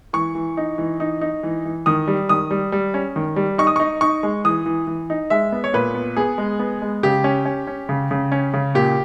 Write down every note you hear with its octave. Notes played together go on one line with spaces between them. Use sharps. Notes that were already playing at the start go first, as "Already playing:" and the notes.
E3 C#6
E3
D#4
E3
D#4
D#4
E3
E3
D#3 D#6
G3
D#3 D#6
G3
G3
C#4
D#3
G3
D#4 C#6
D#6
D#4 C#6
D#4 C#6
G#3
E3 D#6
E3
E3
D#4
G#3 E5
B3
C#5
A#2 B4
B3
B3 G#4
G#3
B3
G#3
C#3 G4
C#4
C#4
C#4
C#3
C#3
C#4
C#3
A#2 G4